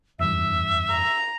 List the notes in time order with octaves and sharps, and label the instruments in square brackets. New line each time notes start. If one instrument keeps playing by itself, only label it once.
[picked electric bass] F1 E2 G2 [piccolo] E5
[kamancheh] A#5